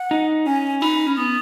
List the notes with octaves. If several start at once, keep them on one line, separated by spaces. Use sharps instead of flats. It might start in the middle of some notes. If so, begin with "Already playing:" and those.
Already playing: F#5
D#4
C#4 G#5
D#4 B5
C#4
B3 D#6